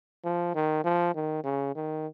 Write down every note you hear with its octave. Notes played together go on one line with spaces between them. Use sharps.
F3
D#3
F3
D#3
C#3
D#3